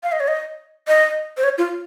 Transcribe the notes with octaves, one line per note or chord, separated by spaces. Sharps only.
F5
D#5
C#5
D#5
D#5
C5
C#5
F4